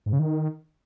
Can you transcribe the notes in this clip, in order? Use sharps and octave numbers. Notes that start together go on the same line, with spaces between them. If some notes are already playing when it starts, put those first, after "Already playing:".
G#2
C#3
D#3